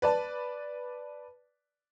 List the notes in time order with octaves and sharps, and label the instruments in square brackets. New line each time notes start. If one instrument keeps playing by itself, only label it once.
[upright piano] B4 D5 A5